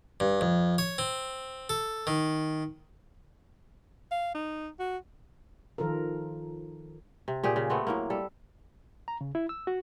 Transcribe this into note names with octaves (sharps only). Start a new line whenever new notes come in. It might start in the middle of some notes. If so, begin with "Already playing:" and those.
G2
F2
C#5
C4
A4
D#3
F5
D#4
F#4
D#3 F3 F4 A4 A#4
C3
A#2 G4 G#4
C#3
A3 B3 C4
A2 F#3 A#3
G3 A4
A#5
C#3
E4
E6
F#4